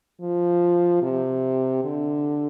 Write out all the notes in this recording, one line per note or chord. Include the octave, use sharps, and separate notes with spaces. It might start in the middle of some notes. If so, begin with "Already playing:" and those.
F3
C3
D3